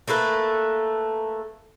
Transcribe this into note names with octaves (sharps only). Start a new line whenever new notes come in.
A3 A#3 A4 B4